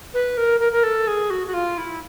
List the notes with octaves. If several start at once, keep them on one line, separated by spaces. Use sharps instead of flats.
B4
A#4
A#4
A#4
A4
G#4
F#4
F#4
F4
E4